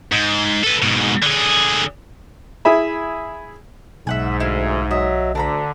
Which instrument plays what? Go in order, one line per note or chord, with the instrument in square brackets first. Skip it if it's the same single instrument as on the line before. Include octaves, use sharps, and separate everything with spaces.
[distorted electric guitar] G#2
A4 B4
G#2 B2
D3 G#4
[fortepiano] E4 G#4 E5 B5
[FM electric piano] B1 [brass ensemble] G#2 [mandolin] E5 F#5 G#5
[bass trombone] D2 [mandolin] E4 F5
[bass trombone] F#3 [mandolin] D#5 E5
[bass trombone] D2 [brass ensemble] D3 [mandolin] D4 A#5 B5